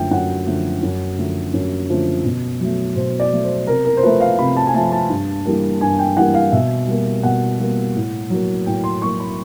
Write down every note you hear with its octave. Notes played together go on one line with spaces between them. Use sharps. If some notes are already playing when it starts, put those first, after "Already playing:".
Already playing: F#2 D3 F3 A3 G5
F#2 F#5
D3 F3 A3
F#2
D3 F3 A3
F#2
D3 F3 A3
B2
F#3 A3
B2 C5
D5
F#3 A3
C5
C3 A#4
A#4
C5
F3 A3 B4
F5
C3 B5
A5
G#5
F3 A3 A5
A5
G2
E3 G3 A#3
G2 G#5
G5
E3 G3 A#3 F#5
F5
B2 E5
G3 A#3
B2 F#5
G3 A#3
A2
F#3 A#3
A2 G5
C6
F#3 A#3 C#6
B5